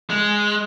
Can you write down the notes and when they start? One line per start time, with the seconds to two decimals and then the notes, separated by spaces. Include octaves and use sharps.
0.10 G#3